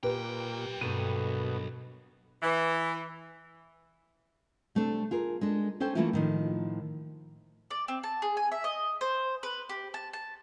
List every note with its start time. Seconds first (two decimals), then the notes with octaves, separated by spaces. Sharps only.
0.03 B1 A#2 G4 B4 G5
0.81 G2 B2 A#3 A4 D#7
2.43 E3
4.75 C3 A3 C4 D4
5.11 F4 G#4 A#4
5.41 G#3 D4 A4
5.80 C#4 A4 C5 G5
5.95 E3 A3 A#3 C#4 E4 F4
6.13 A2 D#3 F3
7.71 D5
7.88 C4
8.04 A5
8.22 G#4
8.37 G#5
8.52 E5
8.64 D#5
9.01 C5
9.43 B4
9.69 G4
9.94 A5
10.13 A5